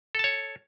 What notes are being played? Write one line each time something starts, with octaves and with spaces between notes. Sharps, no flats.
A4 C#5 A5